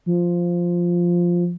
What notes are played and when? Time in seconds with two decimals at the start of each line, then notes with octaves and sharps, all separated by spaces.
0.06 F3